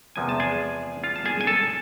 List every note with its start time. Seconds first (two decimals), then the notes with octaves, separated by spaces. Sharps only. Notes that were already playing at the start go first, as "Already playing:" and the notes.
0.16 E2 C3 F3 G#3 G#5
0.29 A5
0.40 G#4 G#5
1.04 F4 F5
1.16 A5
1.25 G#4 G#5
1.41 G#5
1.47 A4 A5